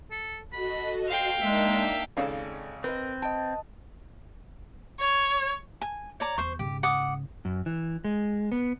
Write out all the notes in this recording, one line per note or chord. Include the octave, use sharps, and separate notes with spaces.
A4
F#4 A4 D#5 B5
C5 F5 G5
G#3 A#3 D4 D#4 E5
G#1 C#3 A4 C#5 D5 F5
C4 A#4 B4 D#5
D#5 G5 A5
C#5
G#5
C#5 D5 A#5
E2 C5 C#6
G#2 C#3 G4
F#5 D6 D#6
F#2
E3
G#3
B3